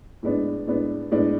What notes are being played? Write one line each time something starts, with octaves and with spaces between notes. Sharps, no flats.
A2 G#3 B3 D4
A2 G#3 B3 D4
A2 G#3 B3 D4